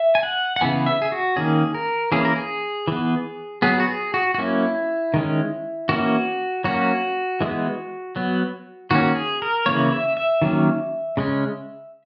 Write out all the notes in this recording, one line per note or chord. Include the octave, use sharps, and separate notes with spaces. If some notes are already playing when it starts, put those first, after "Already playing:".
Already playing: E5
G#5
F#5
F#5
C#3 E3 B3 G#5
E5
G#4
F#4
D#3 A#3 C#4 G#4
A#4
E3 A#3 C#4 G#4
A#4
G#4
E3 B3
F#3 B3 G#4
F#4
G#4
F#4
F#4
F#3 A#3 C#4 E4
D#3 G#3 C#4
E3 A#3 C#4 F#4
F#3 A#3 C#4 F#4
E3 G#3 B3
F#3 B3
D#3 A#3 C#4 F#4
G#4
A#4
C#3 E3 A#3 C#5
E5
E5
D#3 F#3 A#3 C#4
C#3 G#3 C#4